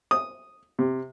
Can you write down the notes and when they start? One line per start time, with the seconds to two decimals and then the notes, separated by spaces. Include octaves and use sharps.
0.11 D#6
0.79 C3